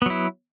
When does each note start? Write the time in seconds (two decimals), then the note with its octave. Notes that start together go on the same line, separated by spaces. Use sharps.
0.02 B3
0.06 F#3
0.10 E4